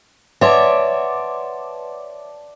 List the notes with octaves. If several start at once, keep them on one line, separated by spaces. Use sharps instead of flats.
B4 C#5 D5 E5 F#5 A5 C6